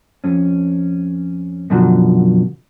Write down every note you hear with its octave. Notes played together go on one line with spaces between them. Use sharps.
F2 C#4
F#2 B2 D3 F3 F#3